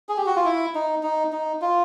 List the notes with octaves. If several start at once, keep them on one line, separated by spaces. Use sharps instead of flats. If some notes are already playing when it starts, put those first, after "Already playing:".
G#4
G4
F#4
F4
E4
D#4
D#4
D#4
F4